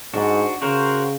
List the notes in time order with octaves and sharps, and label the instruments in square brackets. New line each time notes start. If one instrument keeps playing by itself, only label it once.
[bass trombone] G#2 [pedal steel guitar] D4 F#4
[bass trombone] C#3 [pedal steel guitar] F#4 A#4 C5